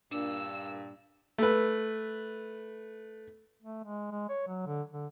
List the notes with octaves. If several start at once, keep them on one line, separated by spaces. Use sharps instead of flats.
G2 A#2 D4 E6
A3 B4
A3
G#3
G#3
C#5
F#3
D3
D3